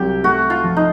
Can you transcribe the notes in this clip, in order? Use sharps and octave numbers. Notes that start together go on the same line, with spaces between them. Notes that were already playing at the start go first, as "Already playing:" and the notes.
Already playing: C2 F#3 G4
A3 F#4
F4
F3
D#4